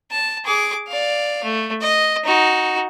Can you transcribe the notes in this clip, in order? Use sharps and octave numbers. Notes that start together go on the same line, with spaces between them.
A5
G#4 D6
D5 F5
A3
D#5
D#4 F#4